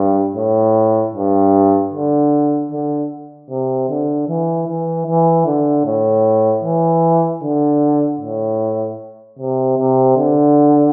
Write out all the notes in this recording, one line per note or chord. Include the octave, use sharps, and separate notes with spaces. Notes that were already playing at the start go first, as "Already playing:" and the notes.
Already playing: G2
A2
G2
D3
D3
C3
D3
E3
E3
E3
D3
A2
E3
D3
A2
C3
C3
D3